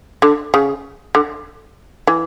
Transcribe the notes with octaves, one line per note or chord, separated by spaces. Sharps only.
D3
C#3
D3
E3